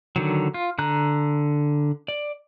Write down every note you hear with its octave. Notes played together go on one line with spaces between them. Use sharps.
D3 D#3 F#3
F4
D3 A#5 F#6
D5